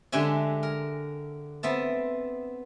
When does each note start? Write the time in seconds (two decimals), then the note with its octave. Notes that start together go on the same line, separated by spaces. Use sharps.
0.12 D3 G#3 D4 G4 E5 G#5
0.63 A#4
1.63 B3 C4 E5 A5